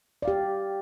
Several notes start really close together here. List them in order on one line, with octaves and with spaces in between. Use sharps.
D5 F5 G4